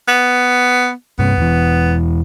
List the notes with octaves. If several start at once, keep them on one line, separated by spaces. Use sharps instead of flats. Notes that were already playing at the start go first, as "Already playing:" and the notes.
B3
G2 C3 B3
E1 E3